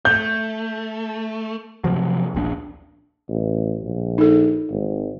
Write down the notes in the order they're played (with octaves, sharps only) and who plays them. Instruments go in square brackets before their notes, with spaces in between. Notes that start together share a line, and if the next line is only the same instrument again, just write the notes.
[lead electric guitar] A3 [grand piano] G6
[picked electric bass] C3 F3 F#3
D#1 A#1 C4 D4
[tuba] A1
A#1
[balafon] D#4 A4
[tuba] G#1